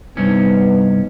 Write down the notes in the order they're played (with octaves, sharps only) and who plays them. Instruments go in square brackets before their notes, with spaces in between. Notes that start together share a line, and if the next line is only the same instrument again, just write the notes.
[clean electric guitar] C2 G2 C#4 [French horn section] B3 D#4